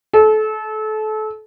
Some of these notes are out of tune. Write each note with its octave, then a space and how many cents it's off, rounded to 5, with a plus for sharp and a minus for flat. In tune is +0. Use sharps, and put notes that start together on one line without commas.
A4 -30